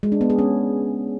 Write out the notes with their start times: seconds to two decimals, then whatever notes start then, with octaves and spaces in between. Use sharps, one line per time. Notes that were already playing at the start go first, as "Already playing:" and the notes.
0.03 G#3
0.12 D4
0.21 B3
0.30 G#4
0.39 C#4